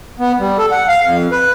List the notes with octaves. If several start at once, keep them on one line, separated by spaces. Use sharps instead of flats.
B3
G3
A4
F#5
F5
F2
B4